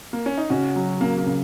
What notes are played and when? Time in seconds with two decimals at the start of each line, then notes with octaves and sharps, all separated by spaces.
0.13 A#3
0.26 C#4
0.38 D#4
0.50 C#3 C#4 F#4
0.76 F#3
1.01 C#3 A#3
1.18 A#3
1.26 C#3